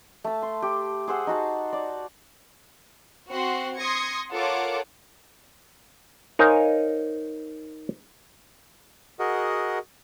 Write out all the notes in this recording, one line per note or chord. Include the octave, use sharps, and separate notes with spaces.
A3 A5
C6
G4
G#4 C5 F#5 E6
D#4 F#4 A5
D5
C4 F#4 F#5 C6
C6 D#6 G#6 A#6 C#7
F4 A4 A#4 C#5 F#5 D6
D#4 A#4 C5 C#5 F5 G#5
F#4 G#4 A#4 D#5 F#5